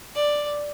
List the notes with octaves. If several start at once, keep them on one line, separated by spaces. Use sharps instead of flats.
D5